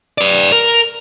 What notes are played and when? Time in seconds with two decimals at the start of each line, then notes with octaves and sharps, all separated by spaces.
0.18 B4 D5
0.52 A#4